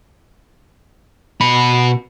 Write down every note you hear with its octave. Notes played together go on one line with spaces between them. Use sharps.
B2 B5